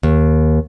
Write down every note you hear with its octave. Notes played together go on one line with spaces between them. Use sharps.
D#2